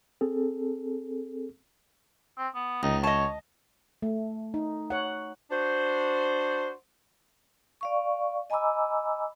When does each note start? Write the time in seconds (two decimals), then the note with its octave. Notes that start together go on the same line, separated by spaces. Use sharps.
0.21 C4 G#4 A4
2.38 C4
2.55 B3
2.83 C#2 D#4
3.03 C#5 D#5 A5
4.02 A3
4.54 D#4
4.90 C#5 F#5
5.51 D4 F#4 C5
7.81 D5 F5 C#6
8.50 D#5 G#5 A#5 B5 D6 E6